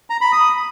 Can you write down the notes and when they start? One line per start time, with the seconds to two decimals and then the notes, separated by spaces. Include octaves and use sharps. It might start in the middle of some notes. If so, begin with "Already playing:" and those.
0.10 A#5
0.21 B5
0.32 D#6